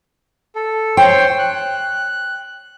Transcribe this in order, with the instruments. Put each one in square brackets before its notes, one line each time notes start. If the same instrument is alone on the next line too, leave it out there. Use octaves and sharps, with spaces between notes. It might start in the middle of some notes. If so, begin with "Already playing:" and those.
[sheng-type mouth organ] A4
[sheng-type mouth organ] C5 C#5 C6 [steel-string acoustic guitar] G5
[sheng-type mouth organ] F#6